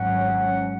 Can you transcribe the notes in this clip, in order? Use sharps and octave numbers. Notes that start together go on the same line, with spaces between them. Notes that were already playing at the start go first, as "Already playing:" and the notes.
Already playing: G#1 G#2 F#3 C#4 F#5